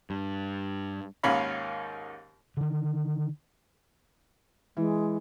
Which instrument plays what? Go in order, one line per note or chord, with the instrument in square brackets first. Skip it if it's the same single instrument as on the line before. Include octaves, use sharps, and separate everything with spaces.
[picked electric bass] G2
[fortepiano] D#2 G#2 D#3 C#4 F5 B5
[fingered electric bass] D3 D#3
[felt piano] E3 [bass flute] G#3